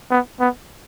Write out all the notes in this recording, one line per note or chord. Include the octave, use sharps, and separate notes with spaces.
B3
B3